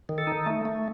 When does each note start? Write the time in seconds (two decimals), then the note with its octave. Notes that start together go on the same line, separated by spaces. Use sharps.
0.09 D#3
0.18 A4
0.27 D#4
0.46 A3
0.65 A3